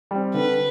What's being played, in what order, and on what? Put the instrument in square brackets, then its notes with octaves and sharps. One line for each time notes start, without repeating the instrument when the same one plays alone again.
[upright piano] G3 C4
[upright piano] D3 [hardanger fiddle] B4